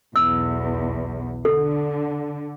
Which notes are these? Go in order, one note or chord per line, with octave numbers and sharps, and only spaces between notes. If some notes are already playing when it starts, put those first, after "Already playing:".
B1 E2 E6
D3 A4